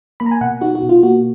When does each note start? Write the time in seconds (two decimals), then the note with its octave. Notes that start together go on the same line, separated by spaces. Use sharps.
0.20 A#3 B5
0.26 A#5
0.31 G#5
0.41 B2 F#5
0.61 D#4 F#4
0.75 F#4
0.83 B2
0.89 F4
1.03 A#3 F#4